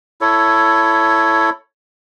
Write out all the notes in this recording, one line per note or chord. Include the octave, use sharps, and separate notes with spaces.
E4 A4 C#5